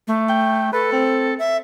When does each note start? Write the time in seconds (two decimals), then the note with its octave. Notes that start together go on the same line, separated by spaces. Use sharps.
0.08 A3
0.29 G5
0.73 A4 B4
0.93 C4
1.39 E5